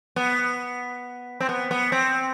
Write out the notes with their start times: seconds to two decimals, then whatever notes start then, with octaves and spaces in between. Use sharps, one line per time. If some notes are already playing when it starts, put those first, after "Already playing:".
0.16 B3
1.40 C4
1.49 B3
1.71 B3
1.92 C4